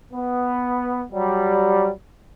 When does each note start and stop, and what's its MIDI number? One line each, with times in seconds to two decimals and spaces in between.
0.13 1.02 59
1.13 1.90 54
1.13 1.90 55